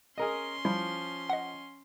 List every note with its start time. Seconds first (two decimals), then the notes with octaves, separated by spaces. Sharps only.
0.18 C#4 G#4 A#4 D#5 C6
0.65 F3 G3 E4
1.30 D#5 F#5